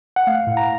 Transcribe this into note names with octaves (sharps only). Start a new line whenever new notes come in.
F#5
A3 F5
A2
A#5